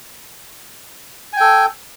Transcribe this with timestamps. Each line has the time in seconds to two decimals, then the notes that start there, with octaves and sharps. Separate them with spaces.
1.33 G#5
1.37 G5
1.41 A4